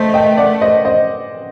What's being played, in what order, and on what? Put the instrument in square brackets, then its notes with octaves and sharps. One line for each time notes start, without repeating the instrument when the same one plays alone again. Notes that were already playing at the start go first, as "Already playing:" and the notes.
Already playing: [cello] A3 [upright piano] C5 D#5
[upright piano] D#5 G5
D5 F#5
C5 D#5
C5 D#5